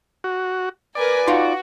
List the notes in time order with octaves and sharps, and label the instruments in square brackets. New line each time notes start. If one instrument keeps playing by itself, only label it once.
[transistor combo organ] F#4
[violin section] A#4 B4 G#5 [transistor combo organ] D5
[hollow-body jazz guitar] D#4 F4 C6 [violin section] F#4